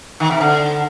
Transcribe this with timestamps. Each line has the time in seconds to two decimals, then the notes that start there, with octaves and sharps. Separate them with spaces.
0.20 D#3
0.31 C3
0.41 D3